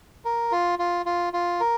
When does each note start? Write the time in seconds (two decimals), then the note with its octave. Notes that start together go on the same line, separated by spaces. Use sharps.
0.25 A#4
0.52 F4
0.79 F4
1.06 F4
1.33 F4
1.60 A#4